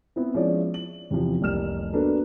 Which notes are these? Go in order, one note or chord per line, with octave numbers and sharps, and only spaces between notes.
B3 C4 E4
F3 G#3 C#4 E4 C#5 D5
F#7
E2 C3 E3 F3
F1 C2 A#3 F6 E7
A#3 B3 D4 F#4 A4 B4